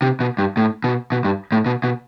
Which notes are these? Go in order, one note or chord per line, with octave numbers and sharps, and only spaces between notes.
C3
B2
G2
A2
B2
B2
G2
A2
B2
B2